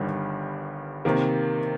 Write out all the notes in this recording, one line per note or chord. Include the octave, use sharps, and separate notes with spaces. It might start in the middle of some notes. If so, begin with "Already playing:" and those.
Already playing: G1 G2 D#3 G3
C3 D#3 A#3